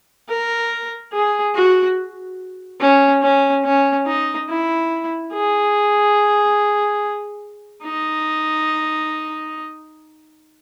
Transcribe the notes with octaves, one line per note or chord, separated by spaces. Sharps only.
A#4
G#4
F#4
C#4
C#4
C#4
D#4
E4
G#4
D#4